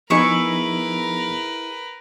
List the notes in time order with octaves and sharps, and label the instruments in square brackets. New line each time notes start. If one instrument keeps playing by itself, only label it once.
[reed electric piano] F3 B3 D#4 [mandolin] E4 G#4 C#6 [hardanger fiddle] A#4 B4